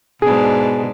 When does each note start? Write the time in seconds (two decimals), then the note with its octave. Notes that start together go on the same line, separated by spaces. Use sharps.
0.22 G#2 B2 D4 G#4